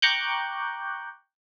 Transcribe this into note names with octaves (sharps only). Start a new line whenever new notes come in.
G5 A#5 C#6 D6 F#6 G6